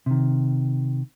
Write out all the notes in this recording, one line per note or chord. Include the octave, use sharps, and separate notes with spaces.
C3 D#3